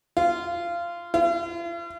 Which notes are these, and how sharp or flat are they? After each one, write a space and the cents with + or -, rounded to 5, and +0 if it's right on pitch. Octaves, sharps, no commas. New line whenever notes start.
F4 -20
F4 -45